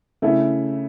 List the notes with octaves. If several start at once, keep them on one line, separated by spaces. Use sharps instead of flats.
C#3 A3 E4